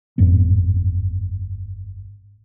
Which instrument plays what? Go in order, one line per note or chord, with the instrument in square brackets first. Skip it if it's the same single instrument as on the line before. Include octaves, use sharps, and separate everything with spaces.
[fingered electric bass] G1 F2 G#2 B3